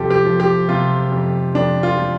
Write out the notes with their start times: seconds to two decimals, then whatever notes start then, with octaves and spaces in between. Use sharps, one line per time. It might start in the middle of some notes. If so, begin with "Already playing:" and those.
Already playing: F2 C3 F3 G4 A4
0.10 G4
0.25 F3
0.40 G4
0.68 C3 F4
1.12 F2
1.55 F2 D4
1.83 F4
1.97 F3